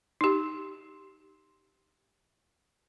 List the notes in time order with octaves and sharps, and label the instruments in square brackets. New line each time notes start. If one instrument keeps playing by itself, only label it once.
[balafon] D#4 G4